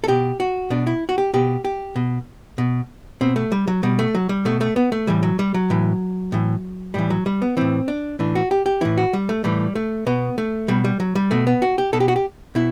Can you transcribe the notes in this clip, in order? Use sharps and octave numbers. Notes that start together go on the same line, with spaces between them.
A4
B2 G4
F#4
B2 D4
E4
F#4
G4
B2 G4
G4
B2
B2
B2 C4
A3
G3
F#3
B2 G3
A3
F#3
G3
B2 A3
A3
B3
A3
A2 E3 G3
F#3
G3
F#3
A2 E3
A2 E3
A2 E3 G3
F#3
G3
B3
A2 E3 C4
D4
A2 E3 D4
F#4
G4
G4
A2 E3 E4
F#4
G3
A3
A2 E3 G3
A3
B2 B3
A3
B2 G3
G3
F#3
G3
B2 A3
B3
F#4
G4
B2 A4
G4
F#4
G4
B2 E4